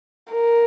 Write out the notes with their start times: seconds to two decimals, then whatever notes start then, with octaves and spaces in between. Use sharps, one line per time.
0.33 A#4